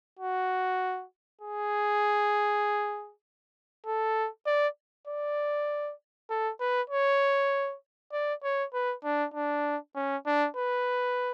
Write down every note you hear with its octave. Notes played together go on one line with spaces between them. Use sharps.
F#4
G#4
A4
D5
D5
A4
B4
C#5
D5
C#5
B4
D4
D4
C#4
D4
B4